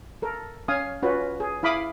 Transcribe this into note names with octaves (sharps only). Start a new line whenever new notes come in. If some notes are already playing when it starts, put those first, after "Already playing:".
A4 A#4
C#4 F5 G#5 D#6
C#4 F4 F#4 B4
G#4
E4 F5 B5 D6 D#6